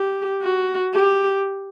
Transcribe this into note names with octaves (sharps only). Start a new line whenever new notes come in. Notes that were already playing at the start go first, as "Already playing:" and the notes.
Already playing: G4
F#4
G4